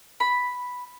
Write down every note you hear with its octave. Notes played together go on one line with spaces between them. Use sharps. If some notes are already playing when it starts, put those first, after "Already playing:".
B5